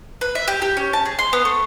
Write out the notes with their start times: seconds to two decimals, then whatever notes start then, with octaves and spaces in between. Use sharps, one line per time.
0.21 B4
0.35 E5
0.48 G4
0.62 G4
0.77 C#4
0.93 A5
1.05 G#4
1.19 C6
1.33 B3
1.45 A3